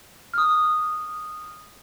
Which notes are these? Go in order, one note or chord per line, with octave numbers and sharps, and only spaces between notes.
D#6 F6